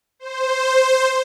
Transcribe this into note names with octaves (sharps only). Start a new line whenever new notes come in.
C5